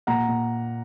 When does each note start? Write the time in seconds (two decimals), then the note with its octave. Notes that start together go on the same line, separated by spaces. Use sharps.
0.07 A#2 F#5 A#5
0.28 A#2